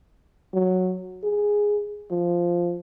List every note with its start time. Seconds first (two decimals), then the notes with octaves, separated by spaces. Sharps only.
0.54 F#3
1.24 G#4
2.11 F3